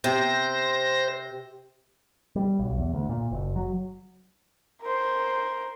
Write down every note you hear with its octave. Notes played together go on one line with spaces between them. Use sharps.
C3 C5 A#6
G3
B1
E2
D2
A#2
F#1
F#3
A#4 C5